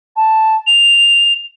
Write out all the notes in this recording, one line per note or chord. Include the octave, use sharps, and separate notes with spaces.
A5
F7